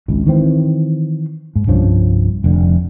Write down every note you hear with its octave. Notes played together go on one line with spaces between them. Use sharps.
G#1 C#2
D#3 E3 C4
G#2
C2 G2 F3 C#4
F1 D3